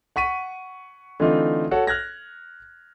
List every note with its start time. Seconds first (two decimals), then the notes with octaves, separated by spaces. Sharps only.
0.16 F#5 C#6 B6 D#7
1.20 D3 E3 A3 C4 D#4 F4
1.71 F#4 A4 C#5 F#5
1.87 F6 F#6 G#6 A#6